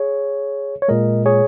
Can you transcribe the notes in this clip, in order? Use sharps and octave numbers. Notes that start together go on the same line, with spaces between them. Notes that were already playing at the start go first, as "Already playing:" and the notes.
Already playing: G#4 C#5
C#5
A#2 G#3 A#4 D#5
G#4 C#5